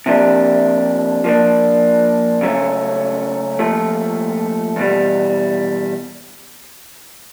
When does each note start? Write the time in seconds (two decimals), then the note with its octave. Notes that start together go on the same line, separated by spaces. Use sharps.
0.06 C3 F3 A#3 D4 G4
1.24 F3 A#3 D4
2.41 C#3 F#3 A3 C#4
3.59 A#2 F3 A3
4.76 E2 B2 G3